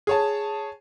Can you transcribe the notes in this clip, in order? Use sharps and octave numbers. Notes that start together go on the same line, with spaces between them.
G#4 C#5 A5